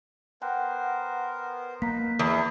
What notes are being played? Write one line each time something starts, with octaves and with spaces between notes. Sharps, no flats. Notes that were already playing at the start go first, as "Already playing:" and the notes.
B3 A#4 C5 F#5 G5 F#6
A#3 D#4 B4 A#5 B6
E2 D#5 E5 A#5 D#6